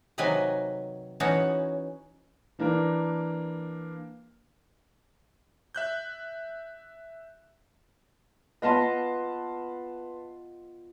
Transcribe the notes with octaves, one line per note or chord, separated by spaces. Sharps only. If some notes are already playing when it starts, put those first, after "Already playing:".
C3 D#3 F#3 B4 D#5 G#5
E3 B3 C#4 D#4 F#4 C#5
E3 A#3 D4 A#4 B4
E5 F#6 G6
B3 F4 B4 D#5 A5 C6